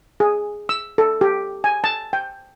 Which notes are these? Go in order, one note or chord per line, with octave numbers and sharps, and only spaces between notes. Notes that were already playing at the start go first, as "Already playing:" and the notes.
G#4
E6
A4
G4
G#5
A5
G5